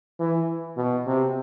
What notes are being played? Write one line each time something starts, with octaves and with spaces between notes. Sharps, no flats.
E3
B2
C3